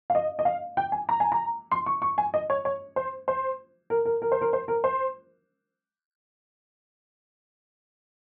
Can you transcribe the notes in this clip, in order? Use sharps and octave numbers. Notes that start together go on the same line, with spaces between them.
F5
D#5
D#5
F5
G5
G#5
A#5
G#5
A#5
C6
C#6
C#6
G#5
D#5
C#5
C#5
C5
C5
A#4
A#4
A#4
C5
A#4
C5
A#4
C5